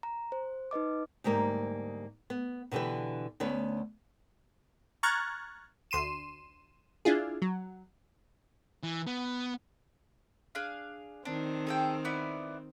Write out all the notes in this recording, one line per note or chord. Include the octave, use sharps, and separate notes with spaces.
A#5
C5
D#4 B4 D#5 D6
D2 G#2 G3 A#3
B3
B2 D3 E3 G4 B4
D2 B3 C#4 B4
A#5 C#6 F6 F#6 G#6 A6
D2 C6 D#7 E7
D4 E4 F4 G#4
F#3
E3
B3
D4 G#4 F5
D#3 C4 D4
G#4 A4 G5
B3 E4 D5